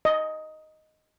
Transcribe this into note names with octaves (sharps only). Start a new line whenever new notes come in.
D#5